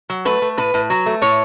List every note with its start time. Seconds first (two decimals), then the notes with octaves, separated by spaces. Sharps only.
0.10 F#3
0.25 A3 B4
0.42 A3
0.57 A2 B4
0.74 A2
0.90 F#3
1.06 A3
1.22 A2 C#5